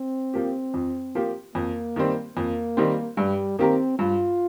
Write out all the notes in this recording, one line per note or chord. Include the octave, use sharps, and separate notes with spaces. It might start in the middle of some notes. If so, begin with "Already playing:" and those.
Already playing: C4
F3 A#3 G4
F2
F3 A#3 G4
F2 A#3
D#3 G3 C4
F2 A#3
D#3 G3 C4
G2 G3
D#3 A#3 C4 G4 A#4
G2 F4